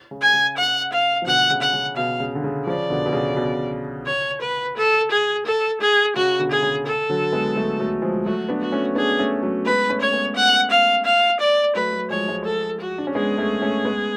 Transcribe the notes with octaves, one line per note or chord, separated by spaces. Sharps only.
C#3
G#5
C#3
F#5
F5
F3
B2 D3 F#5
C#3
F#5
C#3
B2 F5
C#3
D3
C#3
C#3 F3 D5
B2 D3
B2
C#3
B2
C#5
B4
A4
G#4
A4
G#4
C#3 F#4
B2 D3
G#4
C#3
A4
D3 F#3
G#3 B3
F#3 A3
F#3 A3
F3 G#3
F#3 A3 F#4
B3 D4
F#4
A3 C#4
B3 D4 G#4
A3 C#4
F#3 A3
G#3 B3 B4
A3 C#4
C#5
G#3 B3
F#5
F5
F5
D5
F#3 A3 B4
F#3 A3
F3 G#3 C#5
F3 G#3
A4
F#4
D4
C#4
G#3 B3 G#4
A3 C#4
A3 C#4
G#3 B3